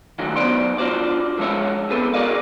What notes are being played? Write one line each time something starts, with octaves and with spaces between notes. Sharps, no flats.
D#3 F3 F#3 A3 D4 F#4
F#3 B3 D#4 C5 D5 C6
D4 F4 F#4 C5 D5
D3 F3 G#3 C#5 E5
B3 C4 G#4 A4 B4
F#4 G#4 A#4 D5 D#5 F5